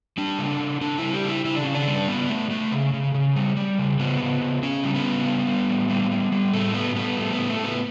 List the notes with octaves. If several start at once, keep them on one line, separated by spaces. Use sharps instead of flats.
G3 D4
C#3
C#3
C#3 D4
G3 E4
G4
C#3 E4
C#3 E4
D4
C#3 C#4
D4
G3
C#3 B3
C#3 A3
C#3 A3
C#3
C#3
C#3
G3
G3
C#3
C#3 B3
C#3
C#3
C#3 C#4
G3
B3
C#3
G3
G3
A2
G3
G3
G3
A2 A3
G3 B3
G3 B3
A2 A3
A2 B3
A3
A2
B3